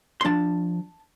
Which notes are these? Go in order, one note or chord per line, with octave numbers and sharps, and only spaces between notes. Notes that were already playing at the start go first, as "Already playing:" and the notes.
C6
F3 D4 A5